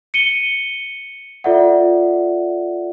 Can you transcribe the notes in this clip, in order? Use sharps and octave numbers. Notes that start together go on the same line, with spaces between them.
C#7 D#7 G7
F4 A4 D5 E5 F#5